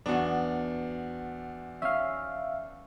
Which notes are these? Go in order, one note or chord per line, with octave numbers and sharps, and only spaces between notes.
E2 B3 D4 F#4
C#4 E5 F5